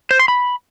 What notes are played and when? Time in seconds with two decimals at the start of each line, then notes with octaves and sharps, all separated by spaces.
0.11 C5
0.19 C6
0.28 B5